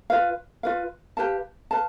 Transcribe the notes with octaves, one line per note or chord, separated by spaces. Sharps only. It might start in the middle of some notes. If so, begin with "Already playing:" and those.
F4 B4 F5
F4 B4 F5
G4 B4 F5 A5
B4 F5 A5